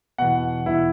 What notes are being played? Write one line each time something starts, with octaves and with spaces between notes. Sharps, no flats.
E2 B2 F#5
E2 B2 E4